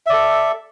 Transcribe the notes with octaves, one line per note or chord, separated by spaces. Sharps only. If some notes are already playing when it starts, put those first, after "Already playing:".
A4 D5 E5